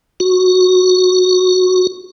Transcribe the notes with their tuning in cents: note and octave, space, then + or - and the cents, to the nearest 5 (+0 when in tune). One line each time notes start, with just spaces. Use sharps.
F#4 -10